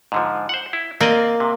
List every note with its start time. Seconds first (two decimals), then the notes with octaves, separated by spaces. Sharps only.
0.12 G#2 D3 F3
0.49 C5 F#5
0.73 E4
1.01 A#3 C4 D5 D#5
1.40 C3